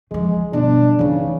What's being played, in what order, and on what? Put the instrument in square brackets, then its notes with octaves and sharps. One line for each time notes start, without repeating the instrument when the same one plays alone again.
[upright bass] C#3 F3 [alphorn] G#3
[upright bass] G2 B2 [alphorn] D4
[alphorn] C#3 [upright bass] E3 D#4